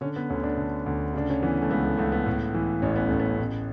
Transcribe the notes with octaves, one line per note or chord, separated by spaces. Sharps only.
D3 C#4
B3
D2 C#4
D4
D3
D2
C#3 D4
C#4
E3 B3
A3
C#2 B3
A3
C#2 A3
B3
A2
E3
A1 C#4
B3
A1 A3
B3
A2